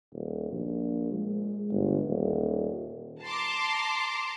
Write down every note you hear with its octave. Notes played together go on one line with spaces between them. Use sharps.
D#1
A#1
G#3
G1
D#1
A5 A#5 C6 D6